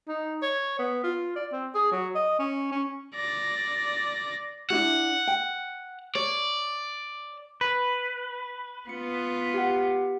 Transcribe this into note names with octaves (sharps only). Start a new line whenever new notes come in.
D#4
C#5
B3
F4
D5
C4
G#4
F#3
D#5
C#4
C#4
D5 A#6
D4 E4 F#4 F#5
G5
C#5 D5
B4
B3 F4 C#7
G4 F#5